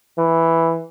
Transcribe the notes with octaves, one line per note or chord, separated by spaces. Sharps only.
E3